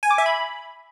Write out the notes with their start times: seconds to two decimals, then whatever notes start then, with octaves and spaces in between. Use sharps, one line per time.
0.03 G#5
0.11 D6
0.18 E5
0.26 B5